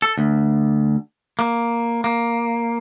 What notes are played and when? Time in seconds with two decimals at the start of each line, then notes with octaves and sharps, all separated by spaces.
0.02 A4
0.18 D2
1.39 A#3
2.04 A#3